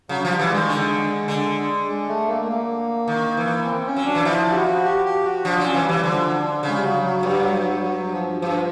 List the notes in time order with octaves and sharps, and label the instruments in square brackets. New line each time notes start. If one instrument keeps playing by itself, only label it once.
[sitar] C#3 [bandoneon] F#3
[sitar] F3
[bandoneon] G3
[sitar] E3
[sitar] D#3 [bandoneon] G#3
[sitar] D3
D3
[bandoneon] G#3
A3
A#3
A3
A#3
[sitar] D#3
E3
[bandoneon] C4
C#4
[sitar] F#3
[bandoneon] D4
[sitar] E3
[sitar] F3 [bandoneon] E4
[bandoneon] G4
F#4
G4
G4
F#4
[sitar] F3 [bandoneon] D4
[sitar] F#3 [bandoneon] C#4
[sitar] E3
[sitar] E3 [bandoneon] G3
[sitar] D3 [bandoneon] F3
[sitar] C#3 [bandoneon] G#3
[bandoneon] G3
F#3
F#3
[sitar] G2 [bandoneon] G3
[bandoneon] F#3
F#3
F#3
F3
[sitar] G2 [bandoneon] F3